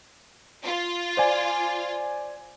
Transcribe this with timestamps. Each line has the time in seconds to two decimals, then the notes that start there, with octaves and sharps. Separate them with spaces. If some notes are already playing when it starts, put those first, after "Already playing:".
0.64 F4
1.17 C5 D5 G#5